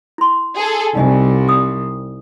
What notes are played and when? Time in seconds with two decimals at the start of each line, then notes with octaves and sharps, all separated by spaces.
0.18 E4 C6
0.56 G#4 A4
0.95 C2 D#4 D#5 G#5
1.49 D#6